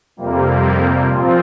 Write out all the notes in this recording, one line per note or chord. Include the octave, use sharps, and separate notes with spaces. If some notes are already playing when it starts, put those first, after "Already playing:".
F2 C3 G3 A#3
A#2 F3 C4 F4